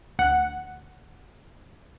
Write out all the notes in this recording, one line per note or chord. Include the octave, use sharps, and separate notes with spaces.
D2 F#5